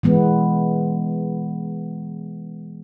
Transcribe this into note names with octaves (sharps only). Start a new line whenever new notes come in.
E3 G#3 B3